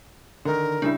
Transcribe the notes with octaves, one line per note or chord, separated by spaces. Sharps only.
D3 D#3 A#4
C#3 G3 D4 E4